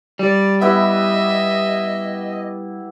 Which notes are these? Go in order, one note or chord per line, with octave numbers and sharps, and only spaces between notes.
G3 D5
B3 E4 G4 D#5 E5